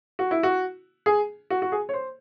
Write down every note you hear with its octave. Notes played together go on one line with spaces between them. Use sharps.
F#4
E4
F#4
G#4
F#4
F#4
G#4
C#5
C5